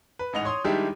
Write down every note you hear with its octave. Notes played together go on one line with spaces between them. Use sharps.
B4
A1 G#2 D#5 F#5 F7
C#5 C6 D#6
D#3 G3 G#3 D4 E4 G4